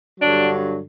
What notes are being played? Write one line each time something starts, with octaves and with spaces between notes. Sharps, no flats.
G2 D3 F#3 D4